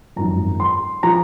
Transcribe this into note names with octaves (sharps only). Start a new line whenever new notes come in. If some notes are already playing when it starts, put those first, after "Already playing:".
G#1 F#2 F3 A#5
C6
F3 A#5